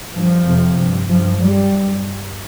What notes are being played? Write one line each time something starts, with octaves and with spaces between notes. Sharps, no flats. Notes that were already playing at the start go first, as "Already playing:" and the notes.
G2 F3
F2 C3
G2
G2 F3
G2 G3